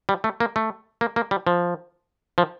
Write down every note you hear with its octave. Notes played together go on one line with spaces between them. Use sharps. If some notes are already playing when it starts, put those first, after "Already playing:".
G3
A3
A#3
A3
A#3
A#3
G3
F3
F3